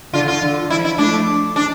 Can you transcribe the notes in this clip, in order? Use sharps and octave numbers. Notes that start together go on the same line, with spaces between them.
D3 F4
F4
D3
F3 E4
E4
A3 D4
D4